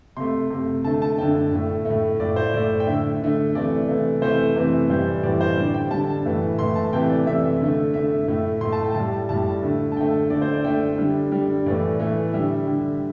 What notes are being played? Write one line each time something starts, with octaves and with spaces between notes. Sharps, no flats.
C3 A3 C6
C3 A3
D3 A3 A5
A5
D3 A3 G5
A2 A3
A2 A3
A2 A3 D5
C5
A2 A3 D5
G5
D3 A3 E5
D3 A3
C3 E3 A3 D5
C3 E3 A3
C3 E3 A3 C5
C3 E3 A3
A2 E3 G3 C5
A2 E3 G3 D5
C5
D3 G3 D5
G5
D3 G3 A5
A2 E3 A3
A2 E3 A3 C6
A5
C3 E3 A3 G5
D5
C3 E3 A3 E5
D3 A3
D3 A3 E5
A2 A3
A2 A3 C6
A5
G5
A2 G3 A5
A2 G3 A5
D3 A3
A5
D3 A3 G5
D3 A3 D5
C5
D5
D3 A3 G5
D3 G3
D3 G3
A2 E3 A3 D5
A2 E3 A3
D3 G3 E5
D3 G3